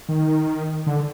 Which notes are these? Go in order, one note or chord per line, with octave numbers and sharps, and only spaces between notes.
D#3
D3